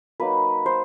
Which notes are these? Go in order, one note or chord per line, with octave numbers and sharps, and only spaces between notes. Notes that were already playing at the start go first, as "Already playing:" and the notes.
F#3 A#3 D#4 B4
C5